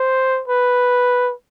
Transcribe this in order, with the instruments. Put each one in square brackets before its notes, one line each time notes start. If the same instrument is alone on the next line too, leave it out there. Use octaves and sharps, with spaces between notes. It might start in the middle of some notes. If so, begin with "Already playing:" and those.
Already playing: [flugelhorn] C5
B4